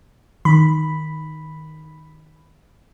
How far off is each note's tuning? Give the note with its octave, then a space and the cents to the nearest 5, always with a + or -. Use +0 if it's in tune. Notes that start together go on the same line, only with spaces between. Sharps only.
D#3 +0 B5 +0